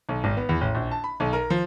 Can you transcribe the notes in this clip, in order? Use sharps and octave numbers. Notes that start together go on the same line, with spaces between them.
B1
G#1
B3
E2
A1
A#1
A5
B5
B1
A#4
F3